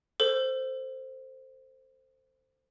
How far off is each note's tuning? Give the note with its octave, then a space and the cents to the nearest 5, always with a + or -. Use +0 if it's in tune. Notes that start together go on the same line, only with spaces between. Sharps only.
A4 +30 C5 +0